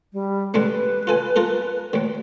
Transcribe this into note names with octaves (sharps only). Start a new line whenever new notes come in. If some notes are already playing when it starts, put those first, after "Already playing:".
G3
D3 G#3 A3 B4
F4 A4 G#5
F4 A4 A#4
D2 D3